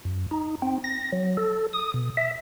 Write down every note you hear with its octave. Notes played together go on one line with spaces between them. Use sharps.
F#2
D#4
C4
A#6
F#3
A4
D#6
B2
E5